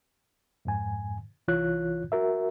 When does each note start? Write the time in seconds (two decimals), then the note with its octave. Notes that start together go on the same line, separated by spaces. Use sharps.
0.65 F2 G#2 G#5
1.48 C2 E3 F4 C#5 F#6
2.12 F#4 A#4 E5